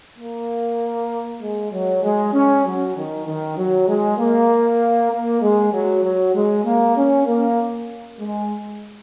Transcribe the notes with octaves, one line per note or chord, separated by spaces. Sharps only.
A#3
G#3
F#3
G#3
C#4
F#3
D#3
D#3
F#3
G#3
A#3
A#3
G#3
F#3
F#3
G#3
A#3
C#4
A#3
G#3